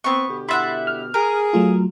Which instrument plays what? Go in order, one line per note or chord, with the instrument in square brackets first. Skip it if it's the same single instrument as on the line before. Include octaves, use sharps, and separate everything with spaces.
[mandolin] B3 C#6 [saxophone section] C4
[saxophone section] B2 D3 G4
[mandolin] E4 E5 F#5 [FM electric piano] B5 C6 A6
[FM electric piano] F6
[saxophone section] G#4 [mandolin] A#4
[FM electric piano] F#3 A3 F4